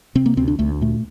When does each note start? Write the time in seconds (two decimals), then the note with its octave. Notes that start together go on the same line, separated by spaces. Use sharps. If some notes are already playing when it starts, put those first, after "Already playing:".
0.15 C3 C4
0.26 A#3
0.37 D2 C4
0.48 D4
0.59 D2 A3
0.81 A#2 A3